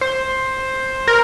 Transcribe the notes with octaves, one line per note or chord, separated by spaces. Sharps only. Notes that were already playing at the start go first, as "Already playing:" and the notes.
C5
A#4